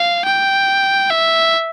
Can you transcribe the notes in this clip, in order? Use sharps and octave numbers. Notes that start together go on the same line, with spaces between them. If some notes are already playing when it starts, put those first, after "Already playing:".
Already playing: F5
G5
E5